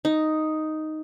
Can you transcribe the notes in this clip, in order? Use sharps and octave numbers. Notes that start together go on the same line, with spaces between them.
D#4